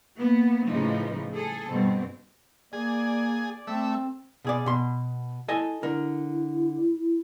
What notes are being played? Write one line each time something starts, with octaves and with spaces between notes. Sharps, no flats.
A#3 B3
A2 C#3 E3 F3 D#4
G#4 A4
G2 B2 C4
A#3 G#4 D5
A3 C4 E5
B2 G#4 D5
B2 C6
E4 A4 D#5 G#5
D3 E4 A#4